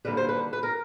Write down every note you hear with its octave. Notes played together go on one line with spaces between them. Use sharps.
D#2 D3 G3 B4
C5
B4
B4
A#4